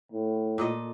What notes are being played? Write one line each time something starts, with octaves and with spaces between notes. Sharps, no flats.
A2
A#2 A4 D#5